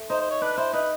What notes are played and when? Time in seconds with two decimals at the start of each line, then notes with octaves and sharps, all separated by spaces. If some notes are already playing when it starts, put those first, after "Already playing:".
Already playing: A3
0.10 D#4 C5
0.21 C5
0.31 C#5
0.42 D4 B4
0.57 E4 C5
0.73 D#4 B4